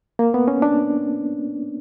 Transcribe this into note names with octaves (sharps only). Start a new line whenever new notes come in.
A#3
B3
C#4
D4